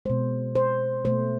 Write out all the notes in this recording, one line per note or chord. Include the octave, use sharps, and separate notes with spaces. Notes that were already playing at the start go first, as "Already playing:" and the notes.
B2 G#3 C5
C5
B2 A3 C5